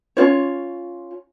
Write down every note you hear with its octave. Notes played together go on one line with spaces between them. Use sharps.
C#4 F4 C#5